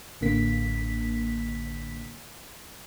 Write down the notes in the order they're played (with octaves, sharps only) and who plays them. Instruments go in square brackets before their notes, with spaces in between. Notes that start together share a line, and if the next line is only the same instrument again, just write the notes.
[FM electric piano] A1 D3 A#3 B6